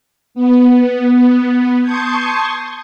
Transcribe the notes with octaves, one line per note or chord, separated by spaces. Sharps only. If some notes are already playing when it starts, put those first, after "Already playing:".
B3
A5 C6 C#6 D#6 G6 G#6